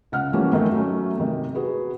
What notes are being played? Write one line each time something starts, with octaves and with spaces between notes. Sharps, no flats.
C#2 F#5 F6
E3 F3 G3 A3 A#3 C#4
D#3 A3 C#4
F#3 A3 C#4
C3 D#3
F#4 G#4 B4